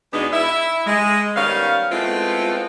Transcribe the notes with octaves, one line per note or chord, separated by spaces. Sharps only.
E2 B2 G#3 B3 D4 D#4
E4 E5
G#3
D#3 G3 B3 C#4 F5
G#3 A3 B3 C4 E4 F4